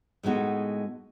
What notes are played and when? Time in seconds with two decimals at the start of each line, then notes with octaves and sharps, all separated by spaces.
0.23 A2 G#3 B3 D#4 F#4